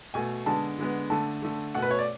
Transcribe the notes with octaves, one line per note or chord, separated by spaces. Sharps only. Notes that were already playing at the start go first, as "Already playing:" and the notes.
B2 A3 G#5
D3 G#3 B3 A5
D3 G#3 B3
D3 A3 A5
D3 A3
B2 A3 F#5
B4
C#5
D5